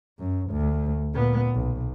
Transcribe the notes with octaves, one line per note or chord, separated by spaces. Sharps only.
F#2
D2
A#2 B3
B1